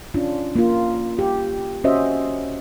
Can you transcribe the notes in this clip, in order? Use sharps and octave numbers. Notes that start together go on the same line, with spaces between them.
C#4 D4 F4
A#3 F4
G4
C#4 F#4 C5 D#5 E5